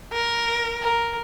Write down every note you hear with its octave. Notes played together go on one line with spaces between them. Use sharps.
A#4
A#4